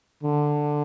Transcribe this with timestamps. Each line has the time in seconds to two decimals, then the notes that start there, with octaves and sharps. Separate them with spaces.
0.23 D3